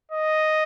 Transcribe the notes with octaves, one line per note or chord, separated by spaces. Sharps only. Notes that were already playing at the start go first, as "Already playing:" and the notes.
D#5